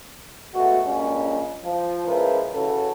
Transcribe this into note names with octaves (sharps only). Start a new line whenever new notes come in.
G#3 A3 B3 F#4
G2 A#2 G#3 C#4
F3
F3 G#3 C#4 E4 A#4 B4
C#3 E3 C#4 F#4 A4